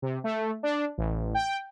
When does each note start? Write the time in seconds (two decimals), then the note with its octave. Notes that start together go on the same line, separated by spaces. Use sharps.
0.02 C3
0.24 A3
0.63 D4
0.98 A1
1.34 G5